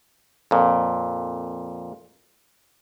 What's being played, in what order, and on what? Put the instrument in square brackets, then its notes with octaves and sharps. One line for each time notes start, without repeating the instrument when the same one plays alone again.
[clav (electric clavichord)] F2 A#2